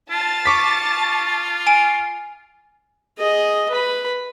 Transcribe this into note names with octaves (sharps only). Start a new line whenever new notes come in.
F4 A5 A6
C#6 D6 B6
G#5 D7
G#4 D#5
B4 B5